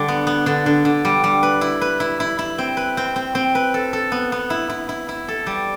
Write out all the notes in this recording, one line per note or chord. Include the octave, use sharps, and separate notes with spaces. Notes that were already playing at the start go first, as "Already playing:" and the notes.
Already playing: D3 G3
B3
B3
D3
D3
D3
G3
G3
B4
E4
B4
E4
E4
E4
C4
B4
C4
C4
C4
B4
A4
A4
B3
B3
E4
E4
E4
E4
A4
G3